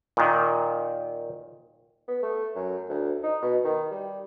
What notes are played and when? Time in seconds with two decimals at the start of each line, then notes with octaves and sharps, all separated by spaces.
0.17 A#2 D#3
2.08 B3
2.23 A3
2.55 F#2
2.89 D2
3.23 D#4
3.42 B2
3.64 D#3
3.91 G3